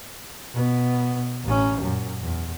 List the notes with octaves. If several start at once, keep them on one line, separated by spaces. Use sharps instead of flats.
B2 B3
A1 C#4
F#2 A#2
E2